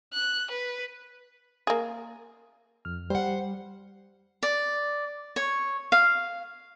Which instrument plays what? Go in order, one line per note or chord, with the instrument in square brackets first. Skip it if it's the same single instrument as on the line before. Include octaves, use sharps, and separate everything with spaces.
[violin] F#6
B4
[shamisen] A#3 G#4
[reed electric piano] F2 F6
[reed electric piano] G3 [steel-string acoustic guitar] C5 F#5
[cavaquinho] D5
C#5
F5